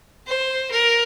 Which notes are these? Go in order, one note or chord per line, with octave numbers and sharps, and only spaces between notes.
C5
A#4